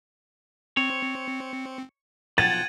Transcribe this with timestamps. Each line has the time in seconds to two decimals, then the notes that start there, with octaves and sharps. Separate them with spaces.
0.77 C4 C#5
2.38 B1 F3 F#5 G5 G#6 A6 D#7 F#7